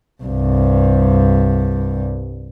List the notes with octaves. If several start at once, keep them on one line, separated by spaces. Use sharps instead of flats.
C2 G2